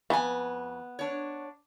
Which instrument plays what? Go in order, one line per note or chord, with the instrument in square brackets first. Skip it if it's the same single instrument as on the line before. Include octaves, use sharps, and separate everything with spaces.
[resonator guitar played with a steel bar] F2 F4 G#5 [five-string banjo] B3
[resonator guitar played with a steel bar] D4 C#5